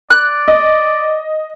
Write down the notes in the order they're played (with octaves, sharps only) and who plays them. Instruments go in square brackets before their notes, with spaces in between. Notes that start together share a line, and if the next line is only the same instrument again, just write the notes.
[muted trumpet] D5 [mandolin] F#6
[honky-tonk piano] D#5